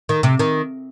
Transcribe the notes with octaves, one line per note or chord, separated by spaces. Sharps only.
D#3
C3
D#3